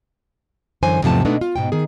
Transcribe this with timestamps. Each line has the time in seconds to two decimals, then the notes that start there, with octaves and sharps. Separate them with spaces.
0.83 F#2 D3 E3 C5 G#5
1.02 E2 G#2 C3 F3 A3 A5
1.25 B2 G#3 A3 B3 D4 D#4
1.41 F4
1.56 G#2 B2 G5
1.72 D#3 G#4